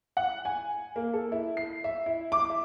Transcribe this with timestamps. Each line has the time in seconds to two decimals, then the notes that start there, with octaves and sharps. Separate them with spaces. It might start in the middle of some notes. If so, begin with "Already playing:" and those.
0.17 F#5
0.45 G#5
0.96 A#3
1.13 A4
1.32 E4
1.57 C7
1.84 E5
2.06 E4
2.32 D6
2.50 E5